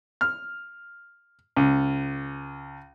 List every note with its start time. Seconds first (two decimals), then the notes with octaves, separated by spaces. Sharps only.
0.21 F6
1.56 C#2